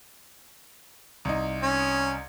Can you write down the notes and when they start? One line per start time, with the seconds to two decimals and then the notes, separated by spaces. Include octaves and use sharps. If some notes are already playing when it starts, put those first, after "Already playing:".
1.25 C2 D#4
1.63 C#4